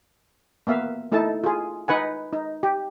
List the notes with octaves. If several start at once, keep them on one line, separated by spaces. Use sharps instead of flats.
A#3 B3 E5 F5
A3 D#4 E4 A4 A5
F4 G#4
D#4 B4 F#5 G#5
D#4
G4